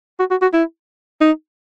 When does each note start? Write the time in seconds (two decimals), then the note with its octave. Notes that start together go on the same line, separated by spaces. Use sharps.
0.19 F#4
0.31 F#4
0.42 F#4
0.53 E4
1.21 D#4